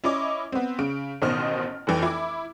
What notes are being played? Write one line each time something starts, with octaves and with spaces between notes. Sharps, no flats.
C#4 E4 D#5 D6
B3 C4
C#3 D7
A1 B2 D#3 C5 D#5 F6
F1 E3 G5
E4 D6